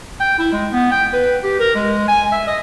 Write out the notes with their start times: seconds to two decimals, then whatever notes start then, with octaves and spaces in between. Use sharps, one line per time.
0.20 G5
0.39 E4
0.52 G#3
0.73 B3
0.91 G5
1.13 B4
1.44 G4
1.59 A#4
1.75 G#3
2.08 G#5
2.32 E5
2.47 D#5